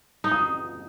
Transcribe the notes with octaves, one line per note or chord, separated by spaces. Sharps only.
D#4
D#6